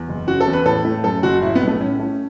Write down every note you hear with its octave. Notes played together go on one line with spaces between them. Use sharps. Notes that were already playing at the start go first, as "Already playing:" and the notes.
Already playing: E2
F#1
C#3 F#4
A4
E2
B4
A2 A4
A3
F#2 A4
F#1 F#4
A2 E4
B3
B1
A3
A2 C#4
A3